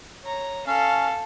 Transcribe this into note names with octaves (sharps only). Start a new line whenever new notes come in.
C#5 A#5
C#4 A4 F5